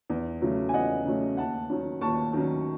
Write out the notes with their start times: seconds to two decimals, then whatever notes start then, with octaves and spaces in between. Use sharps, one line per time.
0.10 E2
0.42 C#3 F#3 A3 C#4
0.69 G#5
0.74 E2 D#5 F#5
1.05 C#3 F#3 A3 C#4
1.37 D#2 F#5 A5
1.70 D#3 F#3 C#4
2.01 D#2 A5 C#6
2.33 D#3 F#3 C#4